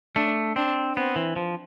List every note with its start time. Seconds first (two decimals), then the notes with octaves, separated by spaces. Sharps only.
0.16 A3 D4
0.56 C4 D4
0.96 B3 C4
1.16 E3
1.36 F3